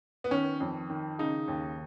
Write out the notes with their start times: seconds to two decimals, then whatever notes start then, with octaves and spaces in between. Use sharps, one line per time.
0.24 B3
0.31 D#3 C#4
0.60 F2
0.90 D#3
1.19 C#3 D#4
1.48 D#2